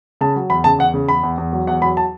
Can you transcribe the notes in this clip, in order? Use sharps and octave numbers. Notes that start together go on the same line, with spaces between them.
C#3 A5
F#3
E2 B5
C#3 A5
E2 F#5
C#3
E2 B5
E2
E2
F#3
E2 F#5
F#3 B5
A5